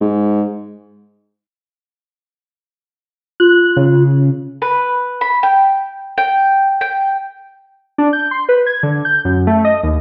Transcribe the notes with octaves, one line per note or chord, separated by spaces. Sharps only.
G#2
F4 F#6
C#3
B4
B5
G5
G5
G5
D4
G6
C6
B4
G#6
D3
G6
F#2
A3
D#5
D#2